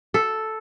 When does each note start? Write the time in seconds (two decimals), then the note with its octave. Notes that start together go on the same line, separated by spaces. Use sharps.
0.14 A4